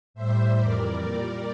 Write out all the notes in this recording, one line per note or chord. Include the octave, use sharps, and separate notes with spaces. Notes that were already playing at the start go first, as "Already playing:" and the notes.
A2 G3 C5 E5
F2 E3 G3 A#4 D5
A#2 G3 A#4 D5